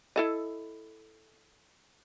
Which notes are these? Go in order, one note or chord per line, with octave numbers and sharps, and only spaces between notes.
E4 A4 D#5